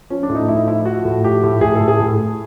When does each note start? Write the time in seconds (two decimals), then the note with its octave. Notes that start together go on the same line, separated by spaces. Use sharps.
0.10 F3 C#4
0.23 D4
0.29 A2
0.35 D#4
0.48 A2 E4
0.57 D#4
0.67 F3 E4
0.85 F3 F#4
1.05 A2
1.24 F3 G4
1.43 A2
1.61 A2 G#4
1.75 A4
1.81 A2
1.88 G#4
2.00 A2